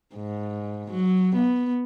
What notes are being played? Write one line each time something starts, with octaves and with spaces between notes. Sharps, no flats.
G#2
F#3
B3